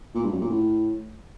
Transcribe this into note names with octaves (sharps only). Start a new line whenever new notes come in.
A#2
G2
F#2
A#2
A2